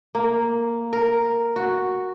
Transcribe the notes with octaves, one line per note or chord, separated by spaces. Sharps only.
A#3
A#4
F#4